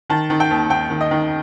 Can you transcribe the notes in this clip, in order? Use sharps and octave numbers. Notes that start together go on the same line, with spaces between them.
D#3 A5
D#3
G5
D#2
D#2 G5
D#3
D#5
D#3